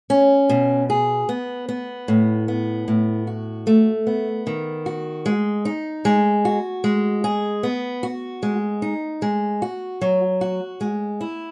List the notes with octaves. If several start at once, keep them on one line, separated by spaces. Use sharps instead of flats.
C#4
B2
G#4
B3
B3
A2
B3
A2
F#4
A3
B3
D#3
F#4
G#3
D#4
G#3
F#4
G#3
G#4
B3
F#4
G#3
D#4
G#3
F#4
F#3
F#4
G#3
E4